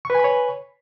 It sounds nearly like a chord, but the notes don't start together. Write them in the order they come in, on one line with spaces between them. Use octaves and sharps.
C#6 B4 G#5 B5 C#5